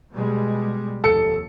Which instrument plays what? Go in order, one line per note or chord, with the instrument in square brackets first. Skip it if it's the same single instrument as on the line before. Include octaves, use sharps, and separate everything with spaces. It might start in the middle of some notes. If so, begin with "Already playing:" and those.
[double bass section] B2 G3 G#3
[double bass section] F1 D#2 [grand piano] A4 C#7